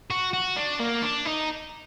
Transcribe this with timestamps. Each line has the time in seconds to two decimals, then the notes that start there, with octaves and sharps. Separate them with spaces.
0.11 F#4
0.33 F#4
0.57 D4
0.80 A#3
1.03 D4
1.26 D#4